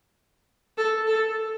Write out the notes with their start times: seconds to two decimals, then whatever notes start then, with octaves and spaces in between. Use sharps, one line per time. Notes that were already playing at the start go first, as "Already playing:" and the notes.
0.77 A4
1.07 A4